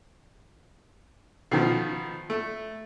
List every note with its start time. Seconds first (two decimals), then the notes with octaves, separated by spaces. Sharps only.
1.51 B2 D#3 F3
2.30 A3